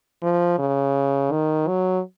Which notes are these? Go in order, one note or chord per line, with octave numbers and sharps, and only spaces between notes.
F3
C#3
D#3
F#3